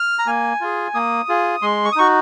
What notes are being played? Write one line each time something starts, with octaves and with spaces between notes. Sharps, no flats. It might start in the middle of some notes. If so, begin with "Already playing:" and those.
Already playing: F6
A#5
A#3 G#5
F4 G#4
A#3 D#6
F4 G#4
G#3 C6
C#6
D#6
D#4 F#4 C#6